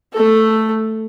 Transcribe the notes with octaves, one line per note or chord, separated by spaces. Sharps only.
A3 A4